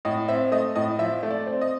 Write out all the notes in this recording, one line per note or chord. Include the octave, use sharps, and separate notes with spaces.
A2 D#5
C4 E5
A3 D#5
A2 D#5
F3 E5
A3
D5
C4
D#5